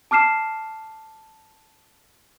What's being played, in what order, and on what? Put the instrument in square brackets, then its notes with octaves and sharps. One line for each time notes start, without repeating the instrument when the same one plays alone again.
[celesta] A5 D6 F6 C7 E7